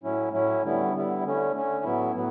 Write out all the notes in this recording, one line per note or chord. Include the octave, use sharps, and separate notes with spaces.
A2 F#3 C#4 E4
A2 F#3 C#4 E4
D3 G3 B3 E4
D3 G3 B3 E4
D3 A3 C#4
D3 A3 C#4
A2 F#3 B3 E4
A2 F#3 B3